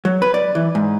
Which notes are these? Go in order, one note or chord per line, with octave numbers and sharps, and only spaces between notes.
F#3
B4
D5
E3
G#2